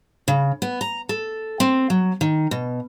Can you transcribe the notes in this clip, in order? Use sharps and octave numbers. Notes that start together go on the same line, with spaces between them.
C#3
B3
A#5
A4
C4
F#3
D#3
B2